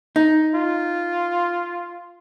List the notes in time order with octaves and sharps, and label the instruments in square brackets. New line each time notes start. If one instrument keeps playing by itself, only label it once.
[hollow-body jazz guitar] D#4
[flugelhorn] F4